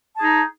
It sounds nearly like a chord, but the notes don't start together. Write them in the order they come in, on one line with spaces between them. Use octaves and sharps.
A5 G#4 D#4